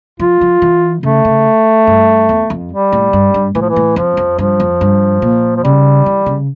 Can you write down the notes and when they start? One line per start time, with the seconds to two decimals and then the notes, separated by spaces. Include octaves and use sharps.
0.19 F3 F4
0.41 F3
0.62 E3
1.03 C#3 A3
1.25 C#3
1.87 G2
2.29 E2
2.50 F2
2.72 G3
2.92 A2
3.13 G2
3.34 G2
3.55 A2 E3
3.61 F3
3.69 E3
3.76 A2
3.96 F2 F3
4.17 F2
4.38 G2 F3
4.60 F2
4.81 G2
5.22 A#2
5.57 F3
5.64 C#3 G3
6.06 E3
6.26 C#3